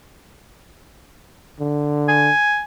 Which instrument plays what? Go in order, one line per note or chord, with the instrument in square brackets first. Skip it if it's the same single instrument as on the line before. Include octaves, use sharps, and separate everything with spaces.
[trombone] D3
[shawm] G#5